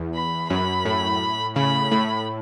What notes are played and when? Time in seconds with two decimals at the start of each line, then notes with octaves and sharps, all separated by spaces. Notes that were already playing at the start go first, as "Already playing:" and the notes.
Already playing: E2
0.15 B5
0.50 F#2 B5
0.85 A2
1.56 C#3 B5
1.92 A2